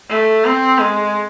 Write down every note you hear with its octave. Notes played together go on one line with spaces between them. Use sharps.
A3
C4
G#3